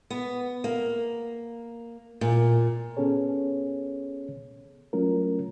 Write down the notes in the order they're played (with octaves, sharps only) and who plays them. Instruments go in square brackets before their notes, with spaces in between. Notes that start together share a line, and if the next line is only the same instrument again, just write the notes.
[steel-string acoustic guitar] B3
A#3
A#2
[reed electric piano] B3 C#4 G#4 A4 C#5
F#3 A3 C#4 F4 A#4